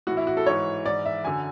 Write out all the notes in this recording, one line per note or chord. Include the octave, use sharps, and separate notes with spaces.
A2 E3 F#4
E4
F#4
A4
G#2 E3 C#5
G#2 E3 D5
E5
F#2 D3 G#5